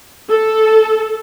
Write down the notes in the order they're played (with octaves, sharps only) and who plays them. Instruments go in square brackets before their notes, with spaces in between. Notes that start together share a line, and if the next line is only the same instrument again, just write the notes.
[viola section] A4